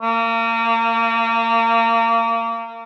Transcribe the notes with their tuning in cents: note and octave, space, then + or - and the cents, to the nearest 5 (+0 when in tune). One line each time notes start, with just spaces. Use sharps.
A#3 -30